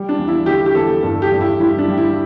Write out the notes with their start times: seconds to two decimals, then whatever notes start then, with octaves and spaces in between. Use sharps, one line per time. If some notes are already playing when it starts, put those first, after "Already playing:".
Already playing: G3
0.09 D4
0.18 E2
0.28 E4
0.46 D3 G4
0.66 G4
0.75 E2 A4
1.03 G2 A4
1.22 G4
1.31 G2
1.41 E4
1.60 G3 E4
1.78 D4
1.88 G3
1.98 E4